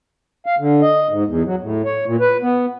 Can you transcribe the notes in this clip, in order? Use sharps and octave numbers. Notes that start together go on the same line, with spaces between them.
F5
D3
D#5
G#2
E2
F#3
A2
C#5
A#2
B4
B3